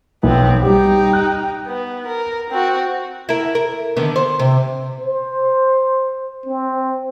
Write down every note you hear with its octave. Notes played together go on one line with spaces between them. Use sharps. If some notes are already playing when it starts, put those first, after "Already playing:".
B1 B3 C4
G3 D#4 G4 G5
F#6
B3
A#4
C4 F#4
E4 A#4
A#4
D3 D#3 B3
C5
C3
C5
C4